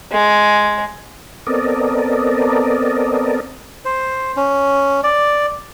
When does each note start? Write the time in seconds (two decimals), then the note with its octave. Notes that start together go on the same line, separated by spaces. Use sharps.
0.12 G#3
1.47 B3 C4 A4 A#4 D5 D#5
3.85 C5
4.36 C#4
5.04 D5